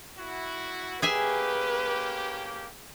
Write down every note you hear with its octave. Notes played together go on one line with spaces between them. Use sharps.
E4 F#4
A#3 C#4 G4 G#4 B4 E5 G#5